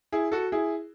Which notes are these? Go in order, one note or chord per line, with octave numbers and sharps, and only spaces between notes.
E4 G#4
F#4 A4
E4 G#4